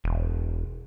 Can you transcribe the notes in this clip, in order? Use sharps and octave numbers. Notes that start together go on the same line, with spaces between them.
E1